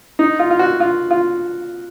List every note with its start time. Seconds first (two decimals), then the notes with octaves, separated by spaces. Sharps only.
0.19 D#4
0.39 F4
0.50 F4
0.59 F#4
0.80 F4
1.11 F4